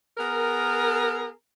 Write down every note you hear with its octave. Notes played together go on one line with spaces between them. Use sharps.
B3 G#4 A#4